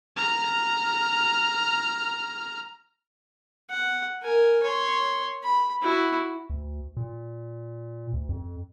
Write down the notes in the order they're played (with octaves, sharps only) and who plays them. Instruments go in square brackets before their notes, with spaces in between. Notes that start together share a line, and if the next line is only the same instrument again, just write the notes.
[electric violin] A#5 F6
[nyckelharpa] F#5
A#4 G#5
C#5 C6
B5
E4 F#4
[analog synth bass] D2
A#2
D2
F2